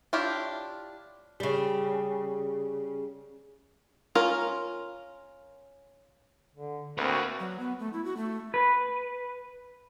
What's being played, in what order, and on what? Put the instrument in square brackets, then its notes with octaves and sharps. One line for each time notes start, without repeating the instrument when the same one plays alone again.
[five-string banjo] D4 E4 F4 G4 C#5
[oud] C#3 G3
[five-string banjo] C#4 F4 A#4
[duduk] D3
[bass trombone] D2 [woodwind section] A#3 F#4 [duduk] C4 [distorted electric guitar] A#4 B4
[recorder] F#3
B3
A3
E4
F#4
A3
[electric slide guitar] B4